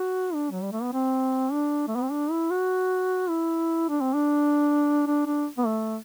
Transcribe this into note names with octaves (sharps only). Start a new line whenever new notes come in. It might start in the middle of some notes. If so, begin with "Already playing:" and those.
Already playing: F#4
D4
F#3
G3
A3
B3
C4
D4
A3
B3
C4
D4
E4
F#4
E4
D4
C4
D4
D4
D4
B3
A3